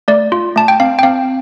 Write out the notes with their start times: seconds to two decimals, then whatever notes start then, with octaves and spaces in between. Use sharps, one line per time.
0.08 A3 D5
0.32 F4
0.56 A3 A5
0.68 G5
0.80 C4 F5
0.99 G5
1.03 C4 F5